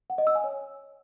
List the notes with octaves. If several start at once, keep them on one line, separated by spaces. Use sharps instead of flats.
F#5
D#5
E6
G#5
C#5